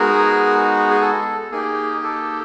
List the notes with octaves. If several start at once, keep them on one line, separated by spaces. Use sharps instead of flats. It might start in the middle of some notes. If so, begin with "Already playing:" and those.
Already playing: G#3 B3 D#4 F#4 G#4 A#4
G#4
A4
A#3 D#4 G4 G#4
A4